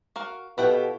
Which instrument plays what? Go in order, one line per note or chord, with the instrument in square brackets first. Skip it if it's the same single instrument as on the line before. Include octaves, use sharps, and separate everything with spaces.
[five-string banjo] F#4 A#4 F5
[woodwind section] B2 [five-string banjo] E4 F#5 G5 [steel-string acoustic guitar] F4 G4 A4